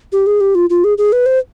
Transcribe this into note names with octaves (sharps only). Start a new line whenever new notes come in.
G4
G#4
G4
F4
F4
G#4
G#4
B4
C5